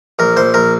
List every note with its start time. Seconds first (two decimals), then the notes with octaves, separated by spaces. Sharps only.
0.19 A#1 A#4
0.37 A#1 C5
0.54 A#1 A#4